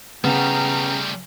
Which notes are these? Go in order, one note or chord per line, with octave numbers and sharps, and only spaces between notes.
C#3 G3 A3 B3 G5 A#5